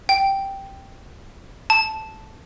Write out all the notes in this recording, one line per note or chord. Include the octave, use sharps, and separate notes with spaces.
G5
A5